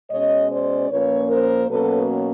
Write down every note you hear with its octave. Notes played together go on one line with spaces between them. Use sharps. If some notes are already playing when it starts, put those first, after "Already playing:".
B2 G#3 C#4 C#5 D#5
C5 D5
A#2 F3 A#3 C#4 B4 C#5
A#4 C5
B2 F#3 A#3 C#4 A4 B4